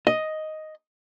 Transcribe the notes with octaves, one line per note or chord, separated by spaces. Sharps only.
D#5